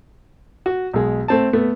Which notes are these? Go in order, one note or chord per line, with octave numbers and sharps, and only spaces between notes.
F#4
B1 G#3
A3 C4 A5
A3 B3